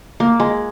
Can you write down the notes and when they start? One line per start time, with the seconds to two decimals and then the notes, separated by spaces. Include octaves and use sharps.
0.20 A#3
0.40 G#3